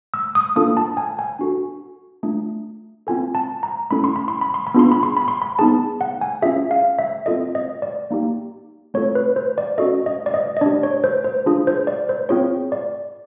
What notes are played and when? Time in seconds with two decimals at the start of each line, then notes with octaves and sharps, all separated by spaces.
0.14 E6
0.35 D#6
0.56 A#3 D4 F4 A4 D#6
0.77 A5
0.97 G#5
1.19 G#5
1.39 D4 F#4 A4
2.23 A3 D4 F4
3.07 C4 F4 A4 G#5
3.35 A5
3.63 A#5
3.91 A3 C#4 E4 A4 B5
4.04 C6
4.16 B5
4.28 C6
4.41 B5
4.54 C6
4.67 B5
4.74 B3 D4 F4 G#4 C6
4.92 B5
5.03 C6
5.17 B5
5.28 C6
5.42 B5
5.59 B3 D#4 G#4 A5
6.01 F#5
6.21 G#5
6.42 C#4 F4 G#4 E5
6.71 F5
6.99 E5
7.26 C4 F4 A4 D#5
7.55 D#5
7.82 D5
8.11 A#3 D#4 G4
8.94 A3 C4 F4 A4 C#5
9.15 B4
9.36 C5
9.58 D5
9.78 C#4 F#4 A4 D#5
10.06 D#5
10.26 D5
10.34 D#5
10.57 D#5
10.61 D4 G4 D5
10.83 C#5
11.04 C5
11.24 C5
11.46 D4 F4 G#4
11.67 C5
11.87 D5
12.09 C5
12.29 C4 F4 G#4 C#5
12.72 D5